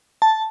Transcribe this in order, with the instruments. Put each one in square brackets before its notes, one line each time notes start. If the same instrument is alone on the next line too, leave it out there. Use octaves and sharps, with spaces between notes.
[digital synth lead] A5